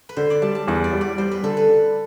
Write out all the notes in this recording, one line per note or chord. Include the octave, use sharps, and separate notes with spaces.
B4
D3 C5
D5
G3 A5
A5
E2 F#5
D5
G3
D5
G3 C5
B4
D3 A4
B4
D3